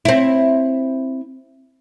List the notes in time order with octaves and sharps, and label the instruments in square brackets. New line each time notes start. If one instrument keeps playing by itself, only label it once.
[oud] C4 E4